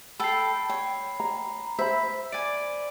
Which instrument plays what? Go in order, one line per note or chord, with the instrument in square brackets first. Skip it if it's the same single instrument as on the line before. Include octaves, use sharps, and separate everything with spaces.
[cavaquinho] A4 G5 [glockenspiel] B5 C7
[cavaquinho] C#5 [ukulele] G5
[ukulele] A#5
[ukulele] C5 B5 [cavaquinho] E5
[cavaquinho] D5 G#5 [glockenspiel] D7